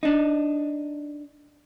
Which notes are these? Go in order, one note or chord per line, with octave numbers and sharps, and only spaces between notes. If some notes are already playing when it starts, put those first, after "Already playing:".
D4 D#4